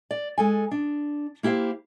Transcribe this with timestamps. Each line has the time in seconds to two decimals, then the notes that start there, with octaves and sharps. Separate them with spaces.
0.11 D5
0.38 G#3 A4 G#5
0.71 D4
1.43 A#3 E4 G4 C5 F5